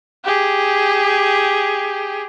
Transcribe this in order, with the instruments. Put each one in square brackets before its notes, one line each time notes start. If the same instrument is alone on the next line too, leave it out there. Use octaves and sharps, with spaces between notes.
[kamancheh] G4 G#4